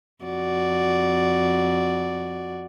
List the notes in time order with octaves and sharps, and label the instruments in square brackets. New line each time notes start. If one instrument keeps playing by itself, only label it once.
[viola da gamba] F2 F#4 D5